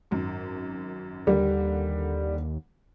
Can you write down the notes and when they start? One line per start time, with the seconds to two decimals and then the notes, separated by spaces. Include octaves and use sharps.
0.11 G#1 F#2
1.27 D#2 D3 G3 A#3